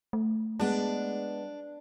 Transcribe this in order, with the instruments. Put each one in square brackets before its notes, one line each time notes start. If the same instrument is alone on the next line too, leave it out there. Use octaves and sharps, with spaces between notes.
[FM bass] A3
[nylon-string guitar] G#3 B3 [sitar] D4